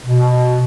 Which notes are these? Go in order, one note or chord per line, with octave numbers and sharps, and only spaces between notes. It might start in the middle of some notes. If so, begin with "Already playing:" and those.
B2